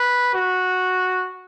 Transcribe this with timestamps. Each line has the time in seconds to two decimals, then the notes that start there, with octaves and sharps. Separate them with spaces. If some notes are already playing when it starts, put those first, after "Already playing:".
Already playing: B4
0.34 F#4